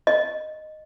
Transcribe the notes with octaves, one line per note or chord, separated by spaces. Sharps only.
D#5